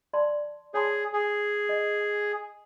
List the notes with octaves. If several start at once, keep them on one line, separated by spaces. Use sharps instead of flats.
D5 A5 C6
G#4 C#5 A5 C6
G#4
D#5